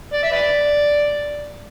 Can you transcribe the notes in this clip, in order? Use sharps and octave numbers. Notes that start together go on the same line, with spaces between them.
D5
E5
B4 D5